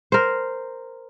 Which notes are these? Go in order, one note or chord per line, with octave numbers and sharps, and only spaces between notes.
A#4 C5